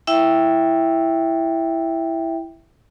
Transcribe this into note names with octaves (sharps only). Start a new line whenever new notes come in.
E4 E5 G5